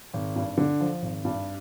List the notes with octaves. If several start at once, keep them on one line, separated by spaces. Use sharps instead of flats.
G#1
G2
D3
F3
G#1
G2